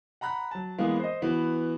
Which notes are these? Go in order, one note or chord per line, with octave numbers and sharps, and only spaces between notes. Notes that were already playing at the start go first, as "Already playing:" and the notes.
F#5 A#5 B5 F#6
F#3 A5
E3 G#3 A#3 B3
C5 D#5
E3 B3 F#4